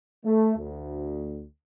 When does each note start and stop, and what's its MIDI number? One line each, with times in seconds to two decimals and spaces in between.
0.25 0.53 57
0.57 1.42 38